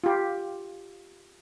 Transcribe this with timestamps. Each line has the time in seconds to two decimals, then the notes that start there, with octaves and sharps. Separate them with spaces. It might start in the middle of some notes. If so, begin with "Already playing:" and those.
0.04 F4 G4